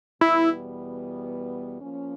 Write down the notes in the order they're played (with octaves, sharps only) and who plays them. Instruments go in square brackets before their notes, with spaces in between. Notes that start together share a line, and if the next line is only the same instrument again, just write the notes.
[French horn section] E2 B2 G3 B3 [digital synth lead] E4
[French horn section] F3 A#3 C#4